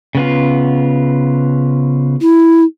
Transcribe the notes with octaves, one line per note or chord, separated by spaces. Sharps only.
C#3 B3 F4
E4